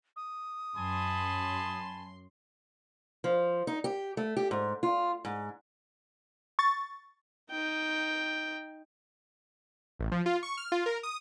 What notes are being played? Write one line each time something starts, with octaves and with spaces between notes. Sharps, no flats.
D#6
F#2 G#5 A5 B5 C6
F3
D#4
G4
A3
G4
G#2
F4
G#2
C#6 A6
D#4 G5
A1
F3
F4
C#6
F6
F4
A#4
D#6